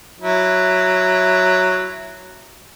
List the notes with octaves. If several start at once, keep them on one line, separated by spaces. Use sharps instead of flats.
F#3 E4